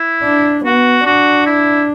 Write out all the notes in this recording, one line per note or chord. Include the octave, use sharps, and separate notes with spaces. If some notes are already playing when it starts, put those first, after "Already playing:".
Already playing: E4
D4
B3 F#4
D4 F#4
E4